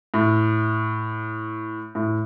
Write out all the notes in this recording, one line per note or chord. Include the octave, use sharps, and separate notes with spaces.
A2
A2